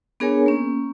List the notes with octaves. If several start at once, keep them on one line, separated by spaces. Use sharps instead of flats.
B3 D4 G#4 A#4 C#5 G#5
A#3 C#4